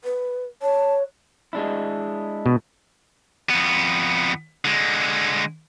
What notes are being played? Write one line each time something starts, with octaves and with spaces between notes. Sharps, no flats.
B4
C#5 A5
G#3 D4 E4
B2
F2 B3
D3 G#3